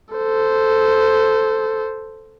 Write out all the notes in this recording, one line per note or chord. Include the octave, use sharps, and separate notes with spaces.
A4 C5